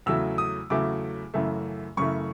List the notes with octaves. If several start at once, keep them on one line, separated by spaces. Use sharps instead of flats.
E2 C#3 F#3 A3 E6
D#6
E2 C#3 F#3 A3 D6
F#2 C#3 E3 A3
F#2 C#3 E3 A3 C#6